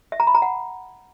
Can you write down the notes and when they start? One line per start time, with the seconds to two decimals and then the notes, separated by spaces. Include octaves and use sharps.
0.12 E5
0.20 A#5
0.27 B5
0.35 A#5
0.42 F#5